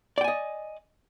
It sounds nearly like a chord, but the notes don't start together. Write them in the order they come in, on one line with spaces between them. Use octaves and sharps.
D5 G5 G#5 D#5